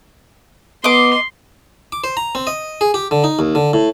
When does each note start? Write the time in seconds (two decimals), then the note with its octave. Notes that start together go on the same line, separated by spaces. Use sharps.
0.84 B3 D#5 C6 D6
1.92 D6
2.04 C5
2.17 A#5
2.35 C4
2.47 D#5
2.81 G#4
2.94 G4
3.11 D3
3.24 D#4
3.39 D#2
3.55 D3
3.73 A2